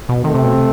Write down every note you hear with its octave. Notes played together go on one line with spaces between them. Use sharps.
B2
D#3 A3 C4
C3
B2
C3